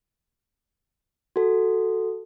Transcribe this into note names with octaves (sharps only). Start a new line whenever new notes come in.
F#4 A4